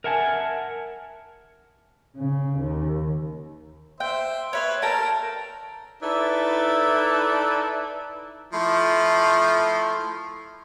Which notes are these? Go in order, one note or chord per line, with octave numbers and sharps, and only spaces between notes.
A#4 E5 F#5 G#5 A5
C#3
D#2
C5 E5 G5
B4 C#5 E5 C6
A4 A#4 G5 A5 A#5
D#4 E4 A4 B4 D5
F3 A3 E4 C6